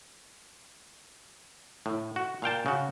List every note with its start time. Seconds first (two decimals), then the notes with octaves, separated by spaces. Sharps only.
1.86 A2
2.16 F#4
2.42 A#2 F5 G5 A5
2.66 C#3 F#4